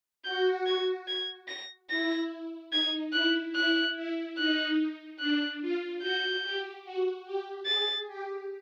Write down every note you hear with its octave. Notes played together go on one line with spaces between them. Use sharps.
F#4 G6
G#6
G#6
A#6
E4 A#6
D#4 G#6
E4 F#6
E4 F#6
E4
D#4 F#6
D4 F#6
F4
F#4 G6
G4
F#4
G4
G#4 A6
G4